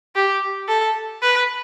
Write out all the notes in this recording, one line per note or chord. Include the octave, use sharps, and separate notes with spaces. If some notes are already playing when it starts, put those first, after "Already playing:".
G4
A4
B4